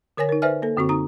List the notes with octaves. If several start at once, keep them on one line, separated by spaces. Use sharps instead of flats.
D3 A#4 C#5 G#5 A#6
D#4 A#4
B4 C5 D5 E5 G#5 F6
A#3 A4
F#2 D3 C4 F#4 C#6
D#4 A#5 D#6